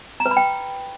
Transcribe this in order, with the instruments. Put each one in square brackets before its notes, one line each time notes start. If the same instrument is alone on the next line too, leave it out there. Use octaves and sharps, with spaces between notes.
[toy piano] A#5
B4
B5
G5